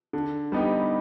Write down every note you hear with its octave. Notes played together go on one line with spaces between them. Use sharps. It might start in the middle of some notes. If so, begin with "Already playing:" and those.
D3
G3 B3 D#4 G4